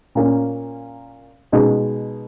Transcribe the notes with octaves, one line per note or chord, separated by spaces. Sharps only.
A#2 A#3 C#4
B2 G#3 D#4 G#4